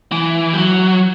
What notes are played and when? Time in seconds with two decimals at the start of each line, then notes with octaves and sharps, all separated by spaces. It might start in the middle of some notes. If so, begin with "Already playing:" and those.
0.12 E3
0.53 G3
0.57 F#3